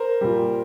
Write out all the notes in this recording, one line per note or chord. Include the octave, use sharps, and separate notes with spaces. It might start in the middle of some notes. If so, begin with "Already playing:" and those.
Already playing: A#4 C5
A#2 G3